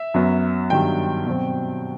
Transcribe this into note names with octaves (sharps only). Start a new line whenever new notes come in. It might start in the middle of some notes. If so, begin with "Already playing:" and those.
Already playing: E5
F#2 F#3 B3
G2 D#3 F#3 B3 G5
B2 F#3 C4